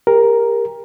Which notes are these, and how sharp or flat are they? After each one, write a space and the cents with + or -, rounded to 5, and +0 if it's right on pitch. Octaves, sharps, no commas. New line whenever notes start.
G4 +35 A#4 +5